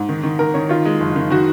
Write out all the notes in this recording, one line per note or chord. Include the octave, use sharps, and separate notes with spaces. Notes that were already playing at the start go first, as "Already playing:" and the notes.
Already playing: G#2
D#3
D#3
D#3 A#4
D#3 C#5
D#3 F4
G#3
F#1
D#3
D#3 F#4